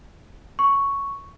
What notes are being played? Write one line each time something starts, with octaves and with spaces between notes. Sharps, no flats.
C#6